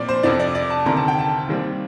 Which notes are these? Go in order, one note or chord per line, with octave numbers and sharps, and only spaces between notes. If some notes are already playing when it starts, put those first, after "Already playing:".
Already playing: A#2 F3 C4 D5
C5
F2 C3 F3 D5
D5
D5
A5
D2 C3 D#3 A#5
A5
G5
A5
D#2 D#3 G3 C4